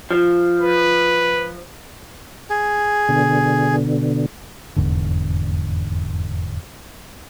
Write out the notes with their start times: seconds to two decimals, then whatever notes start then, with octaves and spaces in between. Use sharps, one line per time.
0.11 F3
0.62 B4
2.50 G#4
3.09 B2 D3
4.76 F1 E2 G#2 D3